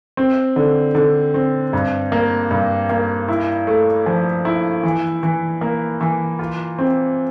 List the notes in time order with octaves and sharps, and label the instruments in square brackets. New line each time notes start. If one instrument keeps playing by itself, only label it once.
[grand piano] C4
D3
D3
C4
G2
A#3
G2
A#3
E4
A3
F3
E4
E3
E3
A#3
E3
F4
C4